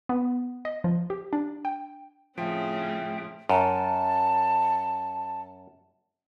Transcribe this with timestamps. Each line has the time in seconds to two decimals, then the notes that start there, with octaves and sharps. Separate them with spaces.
0.09 B3
0.65 D#5
0.84 F3
1.10 G4
1.33 D4
1.65 G5
2.38 A2 C#3 F3 C4 E5 G5
3.49 F#2 A5